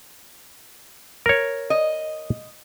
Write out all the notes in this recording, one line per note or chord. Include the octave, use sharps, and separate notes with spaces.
A#4 C#5
D#5